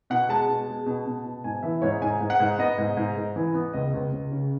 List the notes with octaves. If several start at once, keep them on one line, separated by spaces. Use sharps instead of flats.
B2 F#5
G#3 A5
B2
G#3
B2
B2
B2
G#2 G#5
E3 E5
G#2 C#5
G#2 G#5
G#2
F#5
G#2
B3 D#5
G#2
G#2
G#2
E3
B3
C#2 D#5
C#2
C#2
C#3